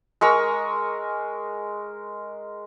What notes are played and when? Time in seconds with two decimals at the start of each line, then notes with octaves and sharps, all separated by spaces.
0.21 G#3 A#4 C#6 E6